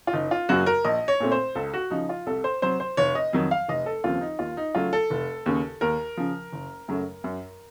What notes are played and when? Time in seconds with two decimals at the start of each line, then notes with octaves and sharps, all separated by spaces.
0.07 F4
0.13 F#1 D#4
0.31 F4
0.49 F#2 C#3 F#3 A#3 F#4
0.66 A#4
0.85 A#1 D#5
1.08 C#5
1.20 A#2 A3 C4
1.32 C5
1.55 C#2 A4
1.74 F#4
1.90 C#3 F3 D#4
2.09 F4
2.26 C2 A4
2.44 C5
2.62 C3 F#3 C5
2.80 C5
2.97 F1 C#5
3.15 D#5
3.33 F2 D#3 F#3
3.51 F5
3.68 F1 D#5
3.86 A4
4.04 D#2 C#3 F3 C4 F4
4.21 D#4
4.39 D#2 F4
4.57 D#4
4.75 C#3 F#3 A3 F4
4.93 A4
5.10 F1
5.46 D#2 C#3
5.81 D#2 A#4
6.17 C#3 F3
6.53 F#1
6.88 F#2 C#3 F#3 A3
7.24 F#2